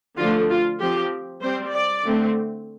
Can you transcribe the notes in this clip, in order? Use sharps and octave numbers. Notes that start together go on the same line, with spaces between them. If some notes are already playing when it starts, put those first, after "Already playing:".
D3 F3 A3 D4 F4
F4
F3 C4 G4
G3 C4 C5
D5
D3 A3 C4